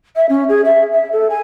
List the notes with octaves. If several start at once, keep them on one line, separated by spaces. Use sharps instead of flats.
E5
C#4
G#4
E5
E5
A4
G#5